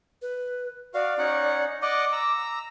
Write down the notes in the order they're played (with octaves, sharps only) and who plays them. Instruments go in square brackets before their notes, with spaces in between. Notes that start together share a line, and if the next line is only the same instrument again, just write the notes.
[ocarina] B4
[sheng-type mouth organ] F#4 F5 [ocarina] D5
[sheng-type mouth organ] C#4 D#4 F#5
[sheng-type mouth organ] D5 D#5 F#5 [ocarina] D6
[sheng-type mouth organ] A#5 E6